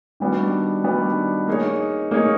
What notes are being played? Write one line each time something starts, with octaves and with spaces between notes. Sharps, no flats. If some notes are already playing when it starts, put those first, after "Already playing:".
D#3 G3 B3 D4 F#4
D#3 G3 B3 D4 F#4
A#3 D#4 G#4 C#5
A#3 D#4 G#4 C#5